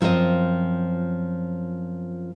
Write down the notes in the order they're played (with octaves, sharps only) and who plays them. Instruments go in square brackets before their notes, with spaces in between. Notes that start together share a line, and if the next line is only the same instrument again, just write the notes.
[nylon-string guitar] F#2 F3 C4 F4 D#5